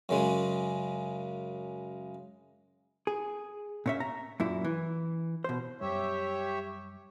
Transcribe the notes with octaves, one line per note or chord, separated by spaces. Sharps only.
F#2 C#3 G#3
G#4
A#2 C#4 E5
A#5
F#2 A#2 E4
E3
B2 C5
F#2 G3 G4 C#5 E5